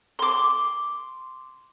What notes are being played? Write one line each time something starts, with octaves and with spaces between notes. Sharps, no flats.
C6 D6